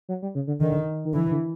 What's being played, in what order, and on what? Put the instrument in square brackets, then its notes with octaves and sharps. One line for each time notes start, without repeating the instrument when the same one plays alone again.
[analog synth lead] F#3
G3
C#3
D3
[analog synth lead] D3 [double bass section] D#3
[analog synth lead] D#3
[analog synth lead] D3 [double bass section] E3
[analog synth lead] D3